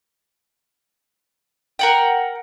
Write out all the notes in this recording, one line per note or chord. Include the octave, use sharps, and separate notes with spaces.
A#4 F#5 G5